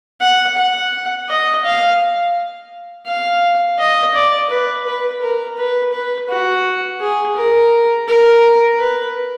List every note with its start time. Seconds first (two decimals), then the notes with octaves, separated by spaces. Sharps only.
0.21 F#5
0.57 F#5
1.29 D#5
1.65 F5
3.07 F5
3.78 D#5
4.14 D5
4.50 B4
4.86 B4
5.22 A#4
5.58 B4
5.93 B4
6.29 F#4
7.00 G#4
7.37 A#4
8.08 A#4
8.79 B4